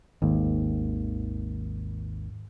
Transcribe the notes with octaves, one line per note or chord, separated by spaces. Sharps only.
G#1 D#2